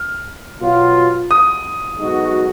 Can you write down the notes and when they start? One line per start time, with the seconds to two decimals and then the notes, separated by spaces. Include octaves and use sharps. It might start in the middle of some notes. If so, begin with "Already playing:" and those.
Already playing: F6
0.60 B2 F#3 B3 F4
1.31 D#6
1.99 B1 B2 G#3 D#4 F#4